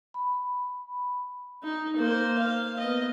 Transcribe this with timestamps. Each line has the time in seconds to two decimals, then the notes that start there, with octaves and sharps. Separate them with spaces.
0.14 B5
1.63 D#4
1.97 A#3 C5
2.38 F5
2.79 B3 D#5